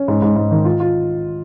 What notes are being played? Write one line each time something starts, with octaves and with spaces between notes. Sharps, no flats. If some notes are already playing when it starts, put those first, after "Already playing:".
Already playing: C#4
G#2
G#2
G#2
D#3
F4
F4